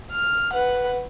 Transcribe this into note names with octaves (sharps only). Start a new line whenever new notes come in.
F6
B4 F#5